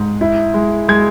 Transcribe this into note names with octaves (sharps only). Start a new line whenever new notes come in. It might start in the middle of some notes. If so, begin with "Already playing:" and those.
Already playing: G#2
E4
G#3
G#3 G#6